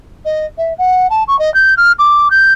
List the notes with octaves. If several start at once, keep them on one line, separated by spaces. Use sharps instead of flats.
D#5
E5
F#5
A5
C#6
D#5
G6
F6
D6
G6